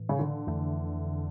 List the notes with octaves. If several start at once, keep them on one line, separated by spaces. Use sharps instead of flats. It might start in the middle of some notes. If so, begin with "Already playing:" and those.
Already playing: A2 E3
C#3
D3
F2 E3 A3